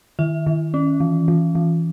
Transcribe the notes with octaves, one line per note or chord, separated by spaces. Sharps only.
D#3 E5
D#3
C#4
E3
E3
E3